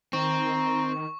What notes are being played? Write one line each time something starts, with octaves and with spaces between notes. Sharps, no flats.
D#3 C4 A#5 C#6